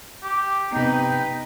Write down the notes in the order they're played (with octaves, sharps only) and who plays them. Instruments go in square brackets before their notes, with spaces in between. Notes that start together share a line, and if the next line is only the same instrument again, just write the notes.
[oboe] G4
[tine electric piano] C3 B3 [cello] D#4 B4 [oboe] G5